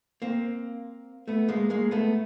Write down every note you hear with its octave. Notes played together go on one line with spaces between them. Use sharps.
A#3 C4
A3 B3
G#3 A#3
G#3 A#3
A3 B3